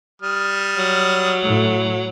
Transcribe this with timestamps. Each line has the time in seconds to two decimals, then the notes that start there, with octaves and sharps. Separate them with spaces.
0.22 G3 D#6 F6
0.78 F#3
1.43 A2